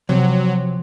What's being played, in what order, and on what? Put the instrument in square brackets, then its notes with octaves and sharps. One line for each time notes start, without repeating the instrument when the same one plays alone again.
[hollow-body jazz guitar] C3 [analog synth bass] F3 [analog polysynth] F#3